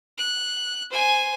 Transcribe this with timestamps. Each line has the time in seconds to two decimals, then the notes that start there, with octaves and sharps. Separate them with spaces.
0.18 F#6
0.91 C5 G#5